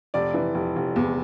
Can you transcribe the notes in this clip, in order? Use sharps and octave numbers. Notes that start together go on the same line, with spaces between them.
F1 D5
E3
F1
F1
E2